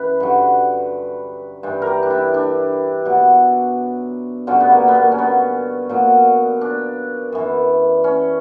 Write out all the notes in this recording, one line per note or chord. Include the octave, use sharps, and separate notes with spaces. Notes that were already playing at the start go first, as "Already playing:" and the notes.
Already playing: F#2 E3 B4
G2 D3 F#3
G2 E3
A#4
G4
D4
E4
D4
B2 F#3
G2 D3 F#3 C#4
B3
A#3
B3
A#3
C#4
B3
A#2 F#3
D4
F#2 E3
C#4